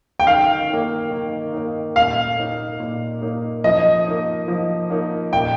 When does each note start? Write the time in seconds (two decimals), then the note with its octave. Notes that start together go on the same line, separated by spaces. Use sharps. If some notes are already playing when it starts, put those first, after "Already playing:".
0.20 G5
0.27 D#3 F5
0.68 D#4
0.73 A#3
1.11 D#3
1.53 A#3 D#4
1.96 A#2 F5
2.37 A#3 D#4
2.80 A#2
3.22 A#3 D#4
3.64 F3 D#5
4.06 A#3 D#4
4.48 F3
4.90 A#3 D#4
5.33 A#2 G5